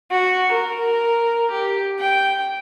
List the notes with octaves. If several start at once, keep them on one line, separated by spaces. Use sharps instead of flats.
F#4
A#4
G4
G5